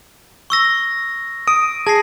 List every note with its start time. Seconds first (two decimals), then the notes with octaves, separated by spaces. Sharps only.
0.50 C#6 E6 A#6
1.48 D#6 D7
1.87 G#4 A5 A#6 C7